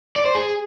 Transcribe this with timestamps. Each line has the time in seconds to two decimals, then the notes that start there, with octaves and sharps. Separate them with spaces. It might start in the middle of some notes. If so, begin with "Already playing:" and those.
0.16 D5
0.25 C5
0.35 G#4